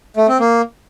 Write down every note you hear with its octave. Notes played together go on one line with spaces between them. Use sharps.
A3
C4
A#3